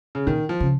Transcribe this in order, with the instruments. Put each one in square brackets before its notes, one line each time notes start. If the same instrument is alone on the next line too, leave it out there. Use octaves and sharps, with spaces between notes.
[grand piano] C#3
[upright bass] A#2 [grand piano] D#3
[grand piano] F3
[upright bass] C#3